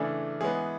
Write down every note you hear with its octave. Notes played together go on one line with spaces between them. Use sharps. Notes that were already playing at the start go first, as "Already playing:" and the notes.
Already playing: C#3 E3 A3 D4 G#4
E3 G#3 B3 G#4